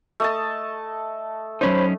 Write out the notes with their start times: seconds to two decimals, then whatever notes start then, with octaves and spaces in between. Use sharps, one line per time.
0.20 A3 D#5 A5
1.61 F#3 C#4 D#4 C5 C#5 B5